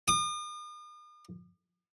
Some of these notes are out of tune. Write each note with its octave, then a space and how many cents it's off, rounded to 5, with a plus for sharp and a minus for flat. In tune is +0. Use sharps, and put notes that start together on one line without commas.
D#6 -45